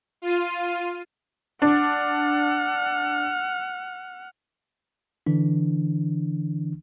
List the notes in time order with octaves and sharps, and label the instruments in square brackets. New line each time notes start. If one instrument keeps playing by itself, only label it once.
[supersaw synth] F4 D#7
[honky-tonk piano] D4 [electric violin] F#5 F6
[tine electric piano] D3 E3 D4